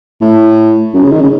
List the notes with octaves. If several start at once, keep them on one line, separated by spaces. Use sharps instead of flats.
A2
F#2
C#3
D#3
C#3